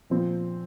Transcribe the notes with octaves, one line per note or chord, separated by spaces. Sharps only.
A#2 F3 C4